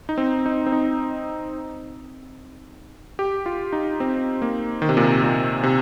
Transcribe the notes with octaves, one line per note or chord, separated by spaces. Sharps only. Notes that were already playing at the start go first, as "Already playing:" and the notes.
D#4
C4
D#4
C4
D#4
G4
F4
D#4
C4
A#3
D#3
C3
A#2
C3
A#2
C3